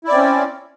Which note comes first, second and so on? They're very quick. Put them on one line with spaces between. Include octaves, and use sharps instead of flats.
E4 D5 C4 C#4